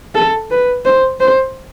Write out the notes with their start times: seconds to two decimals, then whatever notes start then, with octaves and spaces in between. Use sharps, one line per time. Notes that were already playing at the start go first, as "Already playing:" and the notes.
0.15 A4
0.51 B4
0.85 C5
1.20 C5